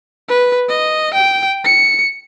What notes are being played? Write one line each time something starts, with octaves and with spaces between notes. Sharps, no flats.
B4
D#5
G5
C#7